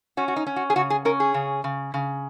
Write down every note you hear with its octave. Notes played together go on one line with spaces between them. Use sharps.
C#4 F#4
F#4
D#4
C#4
F#4
G#4
C#3 F#4
G#4
C#4 A#4
G#4
C#3
C#3
C#3